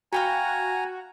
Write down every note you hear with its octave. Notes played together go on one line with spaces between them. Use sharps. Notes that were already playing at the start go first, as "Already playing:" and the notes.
F#4 F5 G5 G#5 A#5 B5